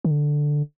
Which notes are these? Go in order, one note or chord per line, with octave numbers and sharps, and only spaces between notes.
D#3
D3